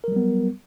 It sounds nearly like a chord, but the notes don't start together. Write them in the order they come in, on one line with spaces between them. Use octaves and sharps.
A#4 F#3 G3 B3